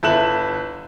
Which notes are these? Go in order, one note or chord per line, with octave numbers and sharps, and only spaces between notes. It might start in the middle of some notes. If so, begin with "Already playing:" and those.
G1 E4 A4 F#6 E7 F#7